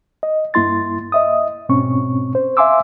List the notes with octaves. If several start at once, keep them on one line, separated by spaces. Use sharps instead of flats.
D#5
G2 A#3 E4 C6 A6
D#5 E5 D#6
G#2 B2 C4 C#4 C#6
C5
E5 F5 G#5 C6 D6 E6